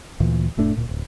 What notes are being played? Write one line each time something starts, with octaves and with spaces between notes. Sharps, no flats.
D2 A#2 E3
F1 A2 A3 D4
D1 A#2
D1